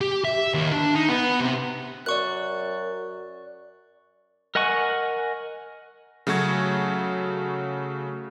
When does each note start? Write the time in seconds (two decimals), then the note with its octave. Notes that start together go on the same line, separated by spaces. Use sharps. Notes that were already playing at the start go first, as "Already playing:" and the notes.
0.01 G4
0.25 E5
0.54 D#2
0.72 D4
0.95 D#4
1.09 B3
1.40 C3
2.06 F#2 D5 C#6 F#6
4.55 A#4 D#5 F#5 G#5 C#6
6.27 C#3 F#3 A3 F#4 C#6 G#6